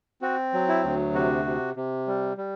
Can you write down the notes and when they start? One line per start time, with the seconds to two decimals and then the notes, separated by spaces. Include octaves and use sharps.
0.22 C4 F#4
0.53 F#3
0.68 E4
0.84 D2
1.14 C3 F#4
1.45 C3
1.76 C3
2.07 G3
2.37 G3